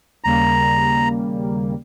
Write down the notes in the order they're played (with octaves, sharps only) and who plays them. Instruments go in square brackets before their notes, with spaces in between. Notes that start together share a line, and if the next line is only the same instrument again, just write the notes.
[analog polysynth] D#2 C#3 G3 A#3 [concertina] A#5